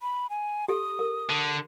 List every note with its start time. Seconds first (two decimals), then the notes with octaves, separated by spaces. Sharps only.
0.02 B5
0.30 G#5
0.68 G4 A4 D#6
0.99 A#4
1.30 D3